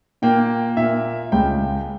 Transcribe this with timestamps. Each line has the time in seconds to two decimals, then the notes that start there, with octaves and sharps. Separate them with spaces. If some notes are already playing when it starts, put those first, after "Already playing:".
0.22 A#2 A#3 G5
0.77 A#2 A#3 E5
1.32 C#2 C#3 G#3 G5